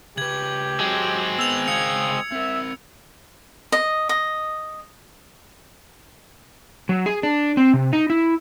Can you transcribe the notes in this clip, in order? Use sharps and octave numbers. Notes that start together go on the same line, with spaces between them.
C#3 G4 B4 G#6 F#7
F#3 G#3 C4
B3 E6 F7
C#3 F5 D#6 G#6 C#7
C4 A#4 E5
D#5
D#5
F#3
G#4
D4
C4
C3
D#4
E4